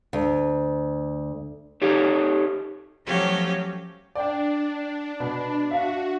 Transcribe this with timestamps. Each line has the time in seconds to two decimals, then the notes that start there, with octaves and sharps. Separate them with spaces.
0.13 D2
1.82 D#4 G4 A4 C#5
3.06 F3 F#3 A3 C#4 G4 F5
4.15 D4 D5 G5
5.20 B2
5.71 F#4 E5 F5